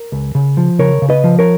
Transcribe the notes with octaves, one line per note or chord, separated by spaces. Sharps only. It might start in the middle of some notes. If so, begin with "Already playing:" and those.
Already playing: A#4
C#2
C#3
F3
C#3 A#4 C#5
C#3
B4 D#5
F3
A#4 C#5